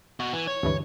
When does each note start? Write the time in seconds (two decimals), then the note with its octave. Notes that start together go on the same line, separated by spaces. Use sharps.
0.20 B2 F#4
0.33 E3
0.47 C#5
0.63 D2 G2 E3